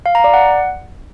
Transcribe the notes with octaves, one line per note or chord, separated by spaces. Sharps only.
F5
A#5
D5
F#5